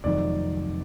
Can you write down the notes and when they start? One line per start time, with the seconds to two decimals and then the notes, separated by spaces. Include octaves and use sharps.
0.04 F1 F2 D#3 F#3 D5